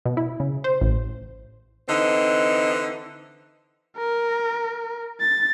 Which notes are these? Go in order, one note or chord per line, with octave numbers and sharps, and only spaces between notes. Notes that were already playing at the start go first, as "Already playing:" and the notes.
B2
E4
C#3
C5
A1
D3 E3 C4 D#4
A#4
A6